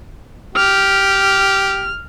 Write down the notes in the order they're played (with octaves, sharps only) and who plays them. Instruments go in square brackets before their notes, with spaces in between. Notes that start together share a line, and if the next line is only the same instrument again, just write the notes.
[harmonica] G4 [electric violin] F6